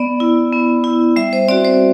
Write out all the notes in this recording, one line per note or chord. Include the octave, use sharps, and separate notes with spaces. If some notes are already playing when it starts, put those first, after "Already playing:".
Already playing: B3 D5
E4
B3
E4
G3 E5
C5
C4 F#4 D5
C5